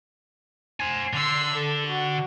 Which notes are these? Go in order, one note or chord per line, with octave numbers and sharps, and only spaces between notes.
C5 G#5
D3 C6 E6
A4
F#4